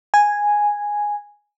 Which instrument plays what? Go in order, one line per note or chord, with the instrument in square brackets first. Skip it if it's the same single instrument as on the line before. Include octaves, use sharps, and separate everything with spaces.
[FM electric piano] G#5